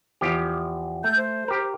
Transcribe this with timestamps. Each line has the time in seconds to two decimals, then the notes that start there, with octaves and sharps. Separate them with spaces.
0.21 E2 F3 G4
1.04 A3 G6
1.16 C5
1.48 G4 A#4